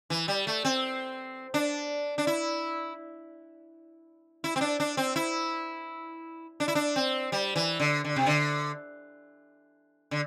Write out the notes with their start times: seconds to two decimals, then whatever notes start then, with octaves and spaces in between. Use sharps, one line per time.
0.10 E3
0.28 G3
0.47 A3
0.65 C4
1.54 D4
2.18 D4
2.27 E4
4.44 E4
4.56 C4
4.61 D4
4.80 D4
4.97 C4
5.16 E4
6.60 D4
6.68 E4
6.75 D4
6.96 C4
7.32 G3
7.56 E3
7.80 D3
8.04 D3
8.16 C3
8.27 D3
10.11 D3